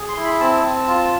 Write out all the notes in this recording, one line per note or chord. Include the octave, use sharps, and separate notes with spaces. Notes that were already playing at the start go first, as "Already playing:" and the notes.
Already playing: G#4
C6
E4
B5
C4 A5
C4
F4